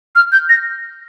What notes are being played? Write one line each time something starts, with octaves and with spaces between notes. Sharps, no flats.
F6
G6
A#6